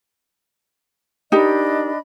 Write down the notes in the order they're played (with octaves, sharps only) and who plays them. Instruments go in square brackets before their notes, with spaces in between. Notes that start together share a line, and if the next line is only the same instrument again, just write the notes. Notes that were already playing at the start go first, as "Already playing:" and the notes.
[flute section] D4 D#5 B5 [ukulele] D#4 G4 A#4